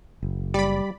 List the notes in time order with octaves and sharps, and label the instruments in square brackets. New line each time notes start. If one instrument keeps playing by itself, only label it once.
[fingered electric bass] F#1
[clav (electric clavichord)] G3 [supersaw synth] D5 B5